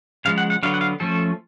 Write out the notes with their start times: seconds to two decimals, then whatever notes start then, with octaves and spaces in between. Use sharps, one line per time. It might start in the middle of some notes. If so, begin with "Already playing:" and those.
0.25 C#3 F3 G#3 F5
0.38 F#5
0.50 F#5
0.63 D3 F#3 B3 F5
0.74 F#5
0.81 F5
1.00 F3 A3 C#4 A4